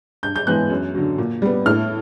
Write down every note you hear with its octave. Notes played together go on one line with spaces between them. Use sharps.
G2 G6
G6
E3 G#3 B3 F#6
F#2
D3 F#3
A#2
G3 B3
A2 F6